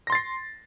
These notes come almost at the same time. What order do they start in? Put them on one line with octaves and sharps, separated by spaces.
A#6 C6 A6 C7